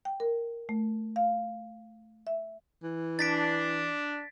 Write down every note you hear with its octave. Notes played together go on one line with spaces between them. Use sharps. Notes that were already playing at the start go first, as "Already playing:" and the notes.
G5
A#4
A3
F5
E5
E3
D4 A6 B6 D7